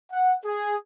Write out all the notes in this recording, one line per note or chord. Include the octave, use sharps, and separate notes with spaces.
F#5
G#4